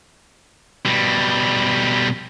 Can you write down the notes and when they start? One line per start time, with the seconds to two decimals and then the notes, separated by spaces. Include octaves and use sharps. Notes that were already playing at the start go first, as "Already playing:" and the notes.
0.85 B2 G3